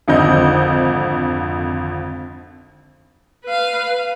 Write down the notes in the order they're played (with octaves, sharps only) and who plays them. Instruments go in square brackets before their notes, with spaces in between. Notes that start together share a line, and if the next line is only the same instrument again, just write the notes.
[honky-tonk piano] G#1 F2 D3 D#5 G6
[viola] B4 F5